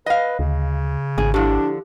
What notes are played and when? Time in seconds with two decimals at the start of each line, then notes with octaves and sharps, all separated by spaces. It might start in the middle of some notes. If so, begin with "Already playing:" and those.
0.06 B4 D#5 F5
0.39 D2 C#3
1.18 G#1 G#4
1.34 D3 F3 D4 E4 G4